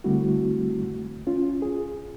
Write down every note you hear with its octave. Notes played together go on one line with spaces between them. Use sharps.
D3 G3 A3 C4 E4 F#4
C#4 F4
G#4